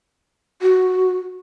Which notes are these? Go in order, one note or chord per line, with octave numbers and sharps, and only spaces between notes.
F#4